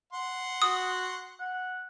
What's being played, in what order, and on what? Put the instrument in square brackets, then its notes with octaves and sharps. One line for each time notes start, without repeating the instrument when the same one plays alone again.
[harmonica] F#5 C6
[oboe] F#4 [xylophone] D#6
[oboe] F#5